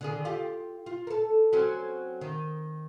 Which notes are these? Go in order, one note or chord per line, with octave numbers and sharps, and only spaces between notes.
D3 D#3 G#4
F4 G4
F4
A4 A#4
F#3 C4 C#4
D#3